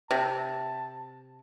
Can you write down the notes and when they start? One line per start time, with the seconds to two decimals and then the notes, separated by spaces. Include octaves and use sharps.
0.11 C3 A5